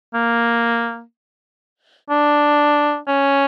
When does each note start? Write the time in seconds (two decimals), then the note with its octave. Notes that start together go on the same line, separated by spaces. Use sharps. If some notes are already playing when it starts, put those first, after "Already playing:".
0.14 A#3
2.10 D4
3.08 C#4